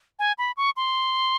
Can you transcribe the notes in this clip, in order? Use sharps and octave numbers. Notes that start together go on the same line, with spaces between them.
G#5
B5
C#6
C6